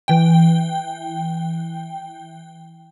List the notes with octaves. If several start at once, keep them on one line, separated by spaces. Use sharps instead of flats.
E3 G5